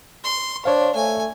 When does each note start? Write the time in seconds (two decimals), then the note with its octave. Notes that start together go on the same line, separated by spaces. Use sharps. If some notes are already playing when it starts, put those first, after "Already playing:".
0.24 C6
0.65 D4 C5 C#5 F5
0.95 A3 G#5